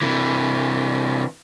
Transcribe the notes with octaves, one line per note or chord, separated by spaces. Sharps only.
C3 E3